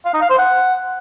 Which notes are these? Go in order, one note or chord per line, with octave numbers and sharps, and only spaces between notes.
F5
D#4
F5
C5
F#5